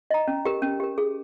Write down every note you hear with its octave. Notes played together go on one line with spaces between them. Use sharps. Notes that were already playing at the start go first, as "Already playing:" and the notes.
D#5 A#5
C#4
G4 A#4
C#4
G4 A#4
G#4